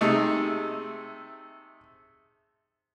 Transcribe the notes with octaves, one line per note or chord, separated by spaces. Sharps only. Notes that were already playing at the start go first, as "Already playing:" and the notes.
C3 A3 D#4 G#4